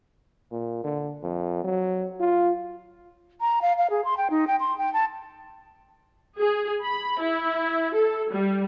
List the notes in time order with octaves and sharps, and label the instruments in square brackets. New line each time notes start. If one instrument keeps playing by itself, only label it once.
[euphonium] A#2
D3
F2
F#3
F4
[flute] A#5
F5
F5
G#4
C6
G5
D#4
G5
C6
G5
A5
[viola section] G#4
B5
E4
A4
G3